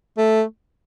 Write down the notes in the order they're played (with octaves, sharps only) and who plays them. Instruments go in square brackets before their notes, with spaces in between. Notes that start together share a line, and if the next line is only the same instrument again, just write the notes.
[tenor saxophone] A3